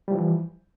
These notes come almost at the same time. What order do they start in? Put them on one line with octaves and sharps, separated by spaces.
G3 F3 E3